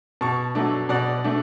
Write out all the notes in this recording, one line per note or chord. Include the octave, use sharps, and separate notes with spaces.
B2 A5 C#6
F#3 A3 D4
B2 D5 F#5
A3 D4